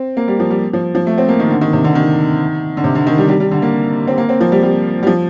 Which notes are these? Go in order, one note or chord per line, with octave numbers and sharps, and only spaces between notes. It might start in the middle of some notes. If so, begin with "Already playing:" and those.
Already playing: C4
A#3
G3
F3
G3
F3
F3
A3
C4
A#3
D#3
D3
D#3
C3
D3
D#3
D3
C3
D3
D#3
G3
G3
G3
D3
A#3
C4
A#3
C4
F3
G3
G3
G3
F3